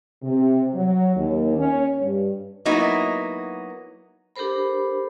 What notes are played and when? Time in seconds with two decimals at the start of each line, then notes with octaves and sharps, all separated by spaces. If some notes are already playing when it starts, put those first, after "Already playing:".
0.22 C3
0.74 F#3
1.16 D#2
1.57 C#4
2.01 G2
2.65 F#3 A#3 B3 D#4 E4 F#4
4.36 D4 G4 A4 A#4 C5 B5